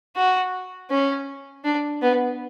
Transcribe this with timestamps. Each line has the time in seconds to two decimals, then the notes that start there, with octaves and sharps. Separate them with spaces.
0.16 F#4
0.90 C#4
1.64 D4
2.02 B3